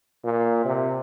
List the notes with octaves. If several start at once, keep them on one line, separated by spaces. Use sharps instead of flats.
A#2
C3